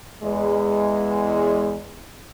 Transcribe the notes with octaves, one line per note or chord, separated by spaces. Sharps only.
E2 G#3